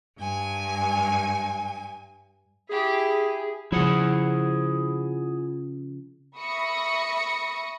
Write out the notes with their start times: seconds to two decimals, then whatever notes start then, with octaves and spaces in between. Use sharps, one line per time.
0.18 G2 G#5
2.69 E4 G4 G#4
3.72 C#3 F3 E4 G#4 F#5
6.37 E5 B5 C#6 D#6 A#6 C#7